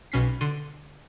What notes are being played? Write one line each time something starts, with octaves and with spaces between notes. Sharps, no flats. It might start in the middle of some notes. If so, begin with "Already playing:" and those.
B1 B2 C#4 B6 C7
D3 C6 D#7